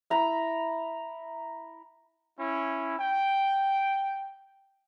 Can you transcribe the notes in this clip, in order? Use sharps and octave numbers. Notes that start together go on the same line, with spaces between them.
E4 A#5 B5
C#4 E4
G5